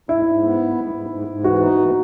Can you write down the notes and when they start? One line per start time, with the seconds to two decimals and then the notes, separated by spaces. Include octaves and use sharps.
0.09 G#2 E4
0.26 G#2
0.43 B3
0.60 G#2
0.76 G#2
0.94 G#2
1.10 G#2
1.28 G#2
1.44 E3 F#4
1.61 D#4
1.78 E3